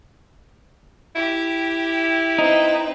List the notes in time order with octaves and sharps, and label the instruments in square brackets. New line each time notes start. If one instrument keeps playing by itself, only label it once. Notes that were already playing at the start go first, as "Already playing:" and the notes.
[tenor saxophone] E4 [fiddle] G4
[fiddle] C4 B4 [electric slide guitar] D#4